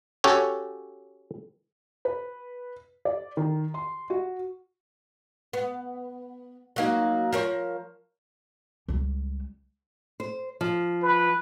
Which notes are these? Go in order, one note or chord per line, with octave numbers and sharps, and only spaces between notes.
C#4 F#4 G4 A4 C#5
B4
D5
D#3
C6
F#4
B3
F#3 A#3 D#4
F3 A#4 C#5
C#2 G3
C5
F3
B4